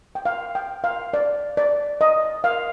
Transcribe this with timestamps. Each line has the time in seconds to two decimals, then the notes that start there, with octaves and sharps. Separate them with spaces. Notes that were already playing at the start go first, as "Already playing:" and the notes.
0.15 G5
0.25 F5
0.55 G5
0.84 F5
1.14 D5
1.57 D5
2.01 D#5
2.44 F5